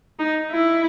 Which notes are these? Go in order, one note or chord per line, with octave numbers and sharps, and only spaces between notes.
D#4
E4